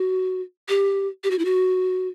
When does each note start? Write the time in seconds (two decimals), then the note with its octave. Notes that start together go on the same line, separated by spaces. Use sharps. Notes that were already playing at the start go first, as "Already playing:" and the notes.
Already playing: F#4
0.69 G4
1.24 G4
1.31 F#4
1.39 E4
1.45 F#4